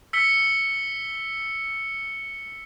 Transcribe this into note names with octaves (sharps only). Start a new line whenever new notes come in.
E6 B6 C#7 G7